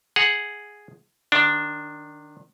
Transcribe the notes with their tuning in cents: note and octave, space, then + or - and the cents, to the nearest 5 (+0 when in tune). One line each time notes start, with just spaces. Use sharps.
G#4 +0 F#5 +0 A#5 +0
D#3 -25 D4 +0